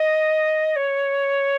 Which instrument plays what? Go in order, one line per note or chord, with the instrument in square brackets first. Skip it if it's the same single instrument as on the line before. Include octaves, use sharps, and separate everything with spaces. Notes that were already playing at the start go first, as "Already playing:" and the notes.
Already playing: [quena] D#5
C#5